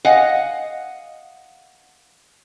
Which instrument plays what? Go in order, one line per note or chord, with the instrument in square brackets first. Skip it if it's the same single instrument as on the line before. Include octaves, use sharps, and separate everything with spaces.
[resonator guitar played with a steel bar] D#5 F5 F#5 G#5